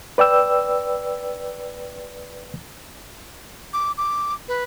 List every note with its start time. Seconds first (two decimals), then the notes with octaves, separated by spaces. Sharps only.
0.18 B4 D5 G5 E6
3.73 D6
3.98 D6
4.48 B4